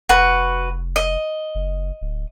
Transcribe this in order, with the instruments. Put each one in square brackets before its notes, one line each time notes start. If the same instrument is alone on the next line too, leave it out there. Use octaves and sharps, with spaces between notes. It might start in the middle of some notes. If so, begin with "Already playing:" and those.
[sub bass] F1 [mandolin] F#4 B4
[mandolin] D#5
[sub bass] F#1
D1